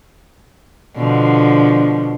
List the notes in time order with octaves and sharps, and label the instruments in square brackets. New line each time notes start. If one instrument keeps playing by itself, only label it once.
[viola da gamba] B2 D3 F3